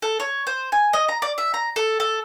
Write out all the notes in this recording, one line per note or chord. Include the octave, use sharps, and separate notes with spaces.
A4
C#5
C5
G#5
D#5
A#5
D5
E5
A#5
A4
A4